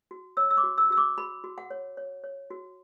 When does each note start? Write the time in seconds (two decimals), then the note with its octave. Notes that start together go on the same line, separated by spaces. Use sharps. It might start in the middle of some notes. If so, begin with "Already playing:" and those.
0.11 F#4
0.37 C#5 E6
0.51 E6
0.57 D6
0.64 F#4
0.78 E6
0.90 F#4 E6
0.97 D6
1.17 F#4 B5
1.44 F#4
1.58 F#5
1.70 C#5
1.97 C#5
2.24 C#5
2.50 F#4